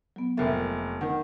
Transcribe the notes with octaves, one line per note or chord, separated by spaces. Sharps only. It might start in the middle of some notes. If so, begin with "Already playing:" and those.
F#3 B3
F1 A#3 E5 A6
D#3 F#5